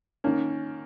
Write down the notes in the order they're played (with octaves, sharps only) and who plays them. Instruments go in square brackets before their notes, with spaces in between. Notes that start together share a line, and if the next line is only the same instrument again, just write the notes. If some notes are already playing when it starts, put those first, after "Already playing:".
[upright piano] D#3 A#3 [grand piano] C#4